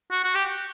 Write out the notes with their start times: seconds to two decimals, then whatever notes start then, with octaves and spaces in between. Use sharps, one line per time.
0.11 F#4
0.24 F#4
0.35 G4